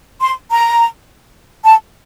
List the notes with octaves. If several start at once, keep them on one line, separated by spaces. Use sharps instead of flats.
C6
A#5
A5